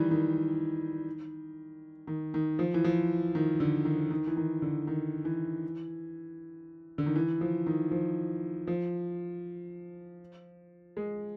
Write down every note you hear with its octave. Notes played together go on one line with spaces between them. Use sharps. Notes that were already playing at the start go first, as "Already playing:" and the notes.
Already playing: D#3 E3 G3
D#3
D#3
D#3
F3
E3
F3
D#3
D3
D#3
D#3
E3
D#3
D3
D#3
E3
D3
D#3
E3
F3
D#3
F3
F3
G#3